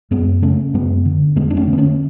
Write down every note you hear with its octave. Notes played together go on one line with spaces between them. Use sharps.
F#2 G#3 B3
C#3 A3 C#4
F#2 G#3 B3
D3
F2 G#3 B3
D4
A3 C#4
D3
B3
A3 C#4